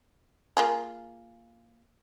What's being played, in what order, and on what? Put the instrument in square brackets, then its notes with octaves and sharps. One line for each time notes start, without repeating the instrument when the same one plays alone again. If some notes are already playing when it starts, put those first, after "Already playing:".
[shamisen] A#3 F4 G#4